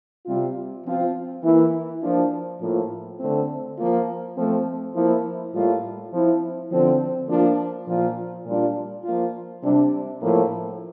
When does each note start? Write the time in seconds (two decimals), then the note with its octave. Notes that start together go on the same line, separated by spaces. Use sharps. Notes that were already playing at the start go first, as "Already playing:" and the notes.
0.25 C3 G3 C4 F4
0.84 F3 C4 F4
1.42 E3 A#3 E4
2.02 F3 A#3 D4 F4
2.60 A2 F3 A#3 F4
3.19 D3 A3 C4
3.77 F3 A#3 F4
4.35 F3 A3 C4
4.94 F3 A#3 E4
5.53 A2 G3 A#3 F4
6.11 F3 C4 E4
6.70 D3 F3 C4
7.28 F3 A#3 D4 F4
7.86 A#2 F3 A#3 F4
8.45 A#2 G3 D4 F4
9.04 F3 A#3 F4
9.62 C3 G3 D4
10.21 A2 F3 A#3